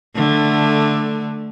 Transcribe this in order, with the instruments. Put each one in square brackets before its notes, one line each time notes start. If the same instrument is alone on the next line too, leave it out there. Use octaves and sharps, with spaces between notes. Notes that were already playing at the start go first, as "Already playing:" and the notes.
[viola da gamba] D3 A3